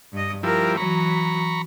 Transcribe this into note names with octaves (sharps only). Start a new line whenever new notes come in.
G2 D#5
F3 G3 E4 A#4
E3 F#3 A#5 B5 C#6